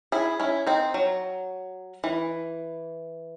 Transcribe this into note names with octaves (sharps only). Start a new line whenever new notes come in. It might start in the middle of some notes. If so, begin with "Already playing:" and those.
E4 G#4
C#4 E4
C4 D#4
F#3
E3